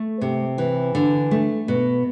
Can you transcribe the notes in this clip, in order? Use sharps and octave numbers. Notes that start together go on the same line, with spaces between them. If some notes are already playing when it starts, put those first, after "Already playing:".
Already playing: A3
C3
E3
D3
A3
B2